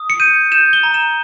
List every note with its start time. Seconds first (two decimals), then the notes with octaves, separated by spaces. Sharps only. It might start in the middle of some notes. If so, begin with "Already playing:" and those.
Already playing: D#6
0.10 C#7
0.20 G6 D#7
0.52 G6 E7
0.73 G7
0.83 A#5
0.94 E7